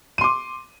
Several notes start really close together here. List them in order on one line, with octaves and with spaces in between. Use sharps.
D#7 C6 D6